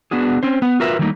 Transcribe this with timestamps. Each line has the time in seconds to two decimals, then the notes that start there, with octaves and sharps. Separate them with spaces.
0.11 B3 D4 F#4 G#4
0.43 C4 C#4 C5
0.62 B3 F#5
0.80 F4 F#4 A#4 B4 E5
0.99 D#3 F#3 G3 A3 A#3 D#4